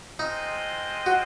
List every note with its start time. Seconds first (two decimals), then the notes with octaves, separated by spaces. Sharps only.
0.19 G#3 C4 D#4 F4 C5 D#5
1.06 F#4